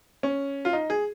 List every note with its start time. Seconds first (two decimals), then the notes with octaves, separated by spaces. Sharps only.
0.23 C#4
0.65 F4
0.73 D#4
0.90 G#4